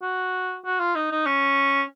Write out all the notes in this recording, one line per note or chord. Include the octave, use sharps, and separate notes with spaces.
F#4
F#4
F4
D#4
D#4
C#4